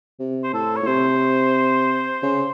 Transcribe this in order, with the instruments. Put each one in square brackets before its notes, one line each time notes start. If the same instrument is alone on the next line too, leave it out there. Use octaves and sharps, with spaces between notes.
[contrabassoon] C3
[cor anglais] C5
[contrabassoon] A2 [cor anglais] A4
[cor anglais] C#5
[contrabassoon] A2
[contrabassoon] C3 [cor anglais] C5
[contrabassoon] C#3